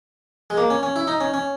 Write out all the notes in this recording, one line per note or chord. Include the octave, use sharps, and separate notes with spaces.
G#3
A#3
C#4
C#4
E4
D#4
C#4
C#4